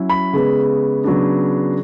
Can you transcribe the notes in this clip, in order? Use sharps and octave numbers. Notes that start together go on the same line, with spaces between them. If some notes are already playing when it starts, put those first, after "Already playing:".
Already playing: F#3 C#4 E4
B5
C#3 G#3 B3
C#3 F#3 B3 D4